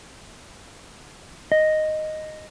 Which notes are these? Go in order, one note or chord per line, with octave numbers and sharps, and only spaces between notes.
D#5